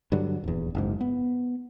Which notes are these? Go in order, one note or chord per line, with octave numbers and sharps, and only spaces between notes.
G2 D3 F#3
D#1 E2
F#1 G#2
B3